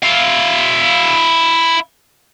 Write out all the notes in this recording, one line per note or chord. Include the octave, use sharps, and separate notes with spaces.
E4 F5